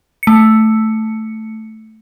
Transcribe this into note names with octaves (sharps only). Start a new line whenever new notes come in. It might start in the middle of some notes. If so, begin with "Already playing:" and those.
A3 C#7